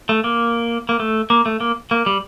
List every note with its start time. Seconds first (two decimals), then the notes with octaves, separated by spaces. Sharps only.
0.09 A3
0.24 A#3
0.89 A#3
1.00 A3
1.30 A#3
1.46 A3
1.60 A#3
1.91 A#3
2.06 G3